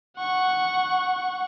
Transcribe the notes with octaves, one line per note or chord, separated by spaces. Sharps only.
F#5 C#6